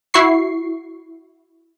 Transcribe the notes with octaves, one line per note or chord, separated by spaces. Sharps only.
E4 F#4 C#6 C7